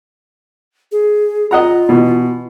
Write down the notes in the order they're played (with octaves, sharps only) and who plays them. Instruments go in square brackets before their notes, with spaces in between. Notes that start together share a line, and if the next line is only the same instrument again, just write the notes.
[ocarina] G#4
[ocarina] F4 [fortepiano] D#5 F#5 A#5
[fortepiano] B2 E3